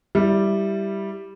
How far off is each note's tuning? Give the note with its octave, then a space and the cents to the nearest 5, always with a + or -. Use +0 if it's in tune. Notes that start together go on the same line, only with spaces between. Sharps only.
G3 +0 E4 +0